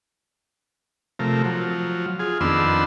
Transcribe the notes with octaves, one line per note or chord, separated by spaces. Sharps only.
C3 F3 A3 A#4
F3 F#3
F4 G#4
F2 D#3 B3 D4 C6 E6